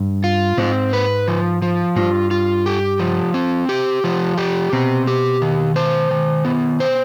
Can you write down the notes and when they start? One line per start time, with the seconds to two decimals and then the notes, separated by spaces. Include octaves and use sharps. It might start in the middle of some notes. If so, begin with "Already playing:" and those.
Already playing: G2
0.24 F4
0.58 G#2 C4
0.93 B4
1.28 F3
1.62 F3
1.96 G2 F4
2.31 F4
2.66 G4
2.99 F3
3.34 C4
3.69 G4
4.04 F3
4.38 G4
4.72 B2 C4
5.07 G4
5.42 D#3
5.76 C5
6.11 D#3
6.45 B3
6.80 C5